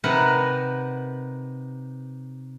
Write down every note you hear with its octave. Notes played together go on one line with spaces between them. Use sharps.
C3 D#4 A#4 B4 F#5